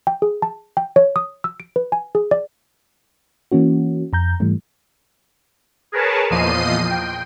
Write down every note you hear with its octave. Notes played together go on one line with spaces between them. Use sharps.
G5
G#4
A5
G5
C#5
D#6
E6
D7
B4
G#5
G#4
D5
E3 A#3 C#4 F#4
F2 A#5 G6
G#2 E3 G3 A3
G#4 A#4 B4 C#5 A5
E2 A#2 F3 D#5 C7 D#7
G5